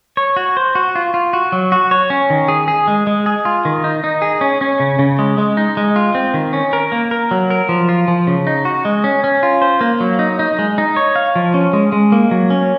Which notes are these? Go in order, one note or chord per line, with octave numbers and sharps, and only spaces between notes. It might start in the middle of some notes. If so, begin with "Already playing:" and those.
C#5
F#4
C5
F#4
F4
F4
F#4
F#3
F#4
C#5
C#4
D#3
G#4
G#4
G#3
G#3
G#4
F4
D#3
D#4
D#4
G#4
C#4
C#4
C#3
C#3
G#3
G#3
D#4
G#3
F4
C4
D#3
C#4
A#4
A#3
A#4
F#3
A#4
F3
F4
F3
C#3
D#4
F#4
G#3
C#4
C#4
F4
C5
A#3
F#3
D#4
D#4
G#3
D#4
C#5
F5
F3
C#4
G#3
G#3
A#3
F#3
C#4